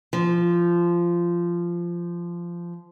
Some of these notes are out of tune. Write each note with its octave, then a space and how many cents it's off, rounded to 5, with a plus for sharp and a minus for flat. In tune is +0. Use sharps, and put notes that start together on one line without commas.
F3 -15